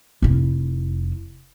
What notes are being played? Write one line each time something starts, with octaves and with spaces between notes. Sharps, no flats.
F1 E4